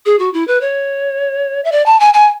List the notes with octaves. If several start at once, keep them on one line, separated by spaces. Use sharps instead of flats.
G#4
F#4
E4
B4
C#5
E5
D5
A5
G#5
G#5